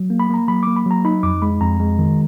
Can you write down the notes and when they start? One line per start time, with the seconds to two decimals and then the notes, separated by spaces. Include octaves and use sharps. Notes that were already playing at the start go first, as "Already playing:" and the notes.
Already playing: F#3
0.10 A#3
0.20 B5
0.30 A#3 A#5
0.48 F#3 B5
0.63 A#3 D6
0.76 B5
0.86 F#3 A#5
1.05 D#4 B5
1.23 F2 D6
1.42 G#3 B5
1.61 F2 A#5
1.80 G#3
1.98 D#3